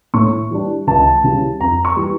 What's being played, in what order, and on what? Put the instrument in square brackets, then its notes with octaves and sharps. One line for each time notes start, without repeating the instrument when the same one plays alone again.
[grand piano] A2 C#6
E3 G3 D4
C#2 A5
C#3 E3 G3
F2 A#5
C#6
E3 G3